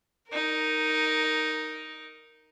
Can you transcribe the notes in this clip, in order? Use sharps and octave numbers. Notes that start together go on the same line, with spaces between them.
D#4 A#4